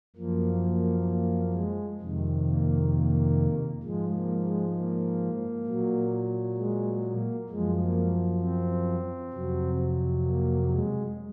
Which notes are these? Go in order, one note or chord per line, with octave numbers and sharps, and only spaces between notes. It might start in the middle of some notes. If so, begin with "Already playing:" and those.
F#2 F3 A#3
A#3
A#3
G#3
F2 C3 D#3
A#3
A#3
G#2 F3 G#3
A#3
G#3
A#3
A#2 F#3
G#3
A#3
F#2 F3 G#3
A#3
C4
F2 C3 F#3
A#3
G#3